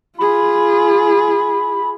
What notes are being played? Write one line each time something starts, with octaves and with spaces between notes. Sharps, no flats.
F4 G#4 B5